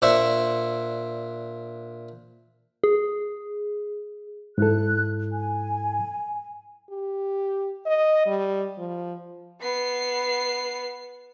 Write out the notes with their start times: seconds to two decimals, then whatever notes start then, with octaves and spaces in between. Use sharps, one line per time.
0.02 A#2 D4 C5 E5 C#6
2.84 G#4
4.58 G#2 E4 A4 F#6
5.32 G#5
6.90 G4
7.86 D#5
8.26 G3
8.78 F3
9.61 B3 C7